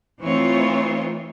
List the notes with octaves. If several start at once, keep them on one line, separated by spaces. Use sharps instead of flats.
E3 A3 C4 D#4 F4 C#5